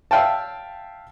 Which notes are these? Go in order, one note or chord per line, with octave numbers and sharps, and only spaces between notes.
E5 F5 G5 A5